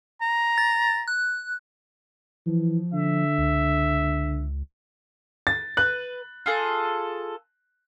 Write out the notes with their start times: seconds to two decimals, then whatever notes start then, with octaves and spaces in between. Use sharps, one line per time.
0.22 A#5
0.58 A6
1.08 F#6
2.46 E3 F3
2.93 D3 E5
3.38 C#2
5.47 A6
5.77 B4 F#6
6.46 F4 G#4 A4